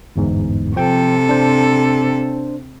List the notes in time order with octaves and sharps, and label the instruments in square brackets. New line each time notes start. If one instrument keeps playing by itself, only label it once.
[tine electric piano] G1 E2 G#2
[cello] C3 A4 [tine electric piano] F3 G5
[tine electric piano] D4 C5